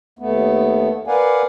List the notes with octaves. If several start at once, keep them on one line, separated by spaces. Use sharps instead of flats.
D#2 A3 B3
A#4 B4 D5 F5 F#5 G#5